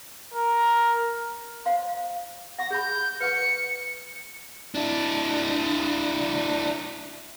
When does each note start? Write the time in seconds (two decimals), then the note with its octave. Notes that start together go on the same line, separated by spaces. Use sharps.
0.34 A#4
1.66 C5 F5 C6
2.59 F#5 C#6 A#6
2.71 G#4 B5 G6
3.21 B4 F#5 C#6 C#7
4.75 D4 E4